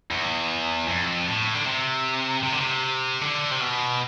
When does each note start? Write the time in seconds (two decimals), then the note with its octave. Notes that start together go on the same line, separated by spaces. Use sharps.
0.11 E2
0.88 F2
1.27 A2
1.55 D3
1.66 C3
2.43 C3
2.53 D3
2.60 C3
3.21 D3
3.51 C3
3.60 B2